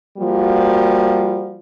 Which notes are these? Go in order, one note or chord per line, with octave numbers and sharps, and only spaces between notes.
F3 G3 A#3 F#4